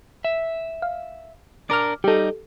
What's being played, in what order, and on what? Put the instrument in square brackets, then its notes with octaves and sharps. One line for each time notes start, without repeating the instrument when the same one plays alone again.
[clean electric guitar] E5
[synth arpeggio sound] F5
[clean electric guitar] D4 A#4 [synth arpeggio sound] D6 F6
[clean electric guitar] G3 D#4 [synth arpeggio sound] G4 A4